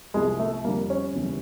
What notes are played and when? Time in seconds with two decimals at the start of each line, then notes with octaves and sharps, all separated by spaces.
0.14 C2 C3 F3 G#3
0.40 A3
0.65 F2 D3 G3 A#3
0.90 C#4
1.15 D#2 C#3 E3 G3